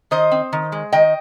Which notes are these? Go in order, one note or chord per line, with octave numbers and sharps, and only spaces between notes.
D#3 C5 D#5
C4
D#3
G#3
D#3 D#5 G5